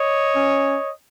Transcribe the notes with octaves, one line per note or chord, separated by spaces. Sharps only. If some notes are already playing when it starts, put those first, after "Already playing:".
Already playing: C#5 D#5
C#4